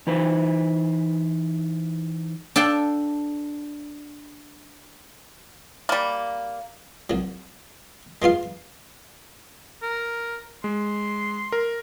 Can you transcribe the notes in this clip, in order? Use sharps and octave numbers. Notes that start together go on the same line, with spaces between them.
E3 D#4 B4 C5
D4 A4 F5 G5
G3 A#3
C2 F#3
G#3 B3 F4 F5
A#4
G#3 C6
A#4